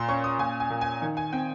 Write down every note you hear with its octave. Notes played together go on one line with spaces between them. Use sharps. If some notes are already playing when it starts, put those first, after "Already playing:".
Already playing: A#2 C6
C#4 C#6
D#6
A#2 G#5
G#5
A#2
G#5
D#3
G#5
C4 G5